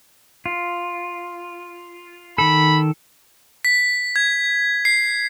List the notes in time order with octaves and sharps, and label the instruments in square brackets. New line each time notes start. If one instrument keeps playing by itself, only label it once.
[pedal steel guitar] F4
[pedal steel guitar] D#3 A4 [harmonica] B5
[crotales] B6
G#6
C7